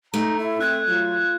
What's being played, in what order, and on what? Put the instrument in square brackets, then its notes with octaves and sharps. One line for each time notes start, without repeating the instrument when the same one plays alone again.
[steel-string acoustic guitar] A3 [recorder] D#4 [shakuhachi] A#5
[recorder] E4 [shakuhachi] E5
[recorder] C4 [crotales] F#6 G#6
[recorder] F#3 [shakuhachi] F4